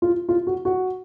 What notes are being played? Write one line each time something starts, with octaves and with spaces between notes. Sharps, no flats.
F4
F4
F#4
F#4